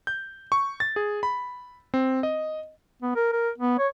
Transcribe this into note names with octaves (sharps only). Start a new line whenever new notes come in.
G6
C#6
A6
G#4
B5
C4
D#5
B3
A#4
A#4
B3
C#5